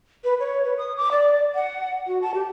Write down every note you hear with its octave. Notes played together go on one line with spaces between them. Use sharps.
B4
C#5
B4
D#6
D6
D5
F#5
F#4
A5
G4